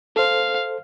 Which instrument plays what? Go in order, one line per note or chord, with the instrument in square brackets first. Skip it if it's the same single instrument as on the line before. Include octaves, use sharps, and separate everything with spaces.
[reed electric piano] A4 C5 [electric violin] F5